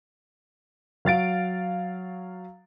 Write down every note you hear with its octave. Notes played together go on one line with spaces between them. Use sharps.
F#3 F5 A6 D7